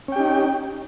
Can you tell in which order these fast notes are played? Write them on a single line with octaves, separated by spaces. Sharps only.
C#4 G5 G4 D#4